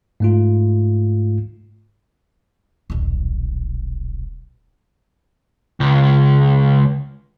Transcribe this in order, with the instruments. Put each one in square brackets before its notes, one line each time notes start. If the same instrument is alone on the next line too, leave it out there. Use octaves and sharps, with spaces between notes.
[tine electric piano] G#2 A3 F4
[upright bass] D#1 B1
[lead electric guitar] C#2